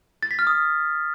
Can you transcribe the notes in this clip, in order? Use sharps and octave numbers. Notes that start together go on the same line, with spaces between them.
A6
B6
F6
D#6